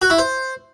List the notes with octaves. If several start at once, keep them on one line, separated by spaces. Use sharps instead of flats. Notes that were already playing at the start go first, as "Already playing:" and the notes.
F#4
E4
C5